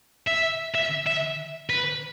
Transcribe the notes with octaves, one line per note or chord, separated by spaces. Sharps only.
E5
E5
E5
B4